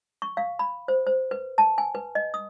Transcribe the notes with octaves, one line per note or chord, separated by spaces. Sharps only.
C#6
F5
B5
C5
C5
B4
A5
G#5
B4
D#5
D#6